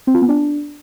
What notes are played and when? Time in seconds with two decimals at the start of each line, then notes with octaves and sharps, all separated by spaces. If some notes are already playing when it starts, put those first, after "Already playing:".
0.07 C4
0.14 F4
0.22 B3
0.29 D4